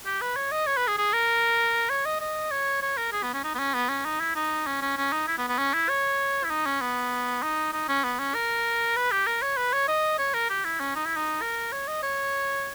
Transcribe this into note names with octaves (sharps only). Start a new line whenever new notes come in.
G4
B4
C#5
D#5
C#5
B4
G#4
G#4
A#4
C#5
D#5
D#5
C#5
C#5
A#4
G#4
B3
C#4
D#4
B3
C#4
B3
C#4
D#4
E4
D#4
C#4
C#4
C#4
D#4
E4
B3
B3
C#4
E4
C#5
E4
D#4
C#4
B3
D#4
D#4
C#4
B3
C#4
A#4
B4
G4
A#4
C#5
B4
C#5
D#5
C#5
A#4
G4
E4
C#4
D#4
E4
D#4
A#4
C#5
D#5
C#5